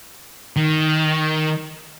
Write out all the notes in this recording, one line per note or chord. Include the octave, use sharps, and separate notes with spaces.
D#3